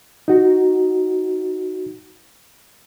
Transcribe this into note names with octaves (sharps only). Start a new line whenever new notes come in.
D#4 F#4